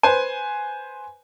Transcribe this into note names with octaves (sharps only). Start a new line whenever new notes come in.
B4 C5 G#5